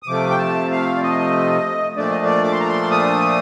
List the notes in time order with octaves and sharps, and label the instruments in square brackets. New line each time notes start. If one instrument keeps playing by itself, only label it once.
[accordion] D#6
C3 F3 A3 D6
G5
A5
F5
D5
D#5
A#2 F3 A3 D4 D5
D#5
D5
D6
C6
A#5
C6
D#6